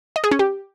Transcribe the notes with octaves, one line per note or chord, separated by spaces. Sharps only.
D#5
G#4
C#4
G4